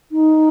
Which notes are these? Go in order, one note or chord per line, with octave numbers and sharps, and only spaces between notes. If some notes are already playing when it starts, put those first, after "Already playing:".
D#4